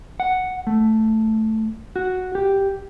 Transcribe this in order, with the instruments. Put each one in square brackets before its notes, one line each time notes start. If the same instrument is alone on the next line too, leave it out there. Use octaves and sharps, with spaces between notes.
[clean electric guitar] F#5
A3
F#4
G4